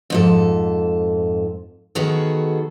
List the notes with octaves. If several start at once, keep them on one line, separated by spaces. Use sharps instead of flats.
F2 G#2 A4
D#3 B3 F#4 G#4 A4